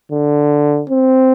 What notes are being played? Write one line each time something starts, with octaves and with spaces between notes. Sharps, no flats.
D3
C4